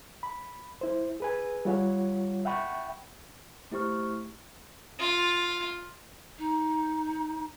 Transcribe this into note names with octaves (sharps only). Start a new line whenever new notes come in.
B5
E4 C5
G#4 B4 G#5
G3 F4 C#5 F#5
E5 F#5 G5 B5 C#6
A3 E4 G4 C5 C#6 F6
F4
D#4